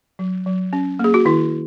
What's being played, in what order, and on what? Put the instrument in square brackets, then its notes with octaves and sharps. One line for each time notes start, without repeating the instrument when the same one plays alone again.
[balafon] F#3
F#3
C#4
A#3 G#4
F#4
D#3 E4